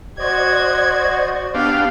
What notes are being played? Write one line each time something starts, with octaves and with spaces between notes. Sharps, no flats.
F#4 C5 D5 D#5 G#6
B3 D4 G4 F5